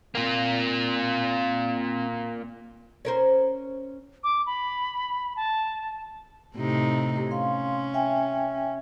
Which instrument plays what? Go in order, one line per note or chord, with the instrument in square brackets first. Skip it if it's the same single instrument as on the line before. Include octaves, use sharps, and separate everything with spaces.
[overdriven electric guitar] A#3 F4 [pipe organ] C4
[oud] C#4 A#4 C5
[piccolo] D6
B5
A5
[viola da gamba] A2 C3 D#4
[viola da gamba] C#4 [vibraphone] F5 C6
[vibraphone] E5 G5 G#5